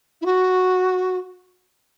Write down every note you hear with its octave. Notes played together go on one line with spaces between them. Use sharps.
E4
F#4